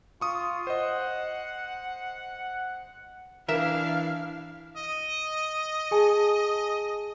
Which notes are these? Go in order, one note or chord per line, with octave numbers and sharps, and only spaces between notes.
F4 C#6 D#6
C5 D#5 F#5
E3 D4 E4 A#4 E5 F5 E7
D#5
G#4 G#5 A5